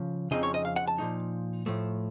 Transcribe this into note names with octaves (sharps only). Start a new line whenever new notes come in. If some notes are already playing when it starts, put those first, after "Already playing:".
Already playing: C#3 F3
F2 C#3 F3 C4 D#4 D#5
C#5
D#5
F5
F#5
A5
A#2 F3 A3 D#4
A2 F3 A3